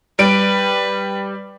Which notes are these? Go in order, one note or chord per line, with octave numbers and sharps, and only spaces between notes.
G3 B4 D7